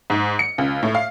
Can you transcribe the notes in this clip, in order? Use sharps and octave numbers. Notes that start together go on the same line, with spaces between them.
G#2
C#7
C#2
A2
F5